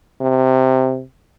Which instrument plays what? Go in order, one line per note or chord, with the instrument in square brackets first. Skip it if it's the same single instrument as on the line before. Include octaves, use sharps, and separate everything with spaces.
[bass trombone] C3